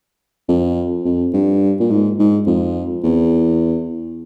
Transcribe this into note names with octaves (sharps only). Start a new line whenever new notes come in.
F2
F2
G2
A#2
G#2
G#2
F2
E2